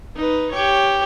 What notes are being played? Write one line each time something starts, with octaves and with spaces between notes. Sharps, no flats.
D#4 B4
G4 C#5